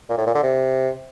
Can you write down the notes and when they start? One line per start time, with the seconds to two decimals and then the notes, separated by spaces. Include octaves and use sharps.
0.09 A#2
0.18 A2
0.26 A#2
0.35 D3
0.43 C3